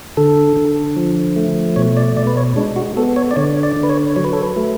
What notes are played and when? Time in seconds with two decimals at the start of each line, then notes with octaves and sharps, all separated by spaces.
0.17 D3 A4
0.57 D3
0.96 F3
1.36 A3
1.76 B2 C#5
1.97 D5
2.17 B2 D5
2.27 B4
2.37 C#5
2.56 G#3 D4
2.76 F#4
2.97 B3 A4
3.16 C#5
3.31 D5
3.36 D3 C#5
3.63 D5
3.77 D3
3.83 B4
3.89 C#5
4.16 F#3 C#5
4.24 B4
4.33 A4
4.43 B4
4.56 A3